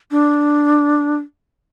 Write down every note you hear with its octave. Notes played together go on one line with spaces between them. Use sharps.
D4